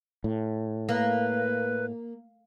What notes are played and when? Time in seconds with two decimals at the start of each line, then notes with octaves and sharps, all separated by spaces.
0.24 A2
0.89 A#3 B4